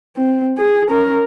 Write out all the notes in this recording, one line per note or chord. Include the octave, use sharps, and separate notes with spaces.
C4
G#4
C#4 A#4